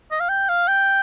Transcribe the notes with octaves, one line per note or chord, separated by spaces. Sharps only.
D#5
F5
G5
F5
G5